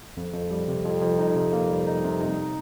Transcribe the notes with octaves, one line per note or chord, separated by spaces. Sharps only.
F2
F2
G3
C3
F2
F2
D#4
C3
A#3
G3
D#4
C3
D#4